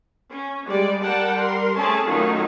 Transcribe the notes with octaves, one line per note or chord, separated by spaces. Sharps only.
C#4
G3 G#3 D5
G3 A#4 F#5 G5 A5
G3 A#4 C6
A3 C4 C#4 G#4 A5
D#3 F#3 A3 C#4 D#4 F4